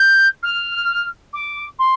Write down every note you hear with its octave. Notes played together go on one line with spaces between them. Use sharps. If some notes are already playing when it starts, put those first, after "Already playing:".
Already playing: G6
F6
D6
C6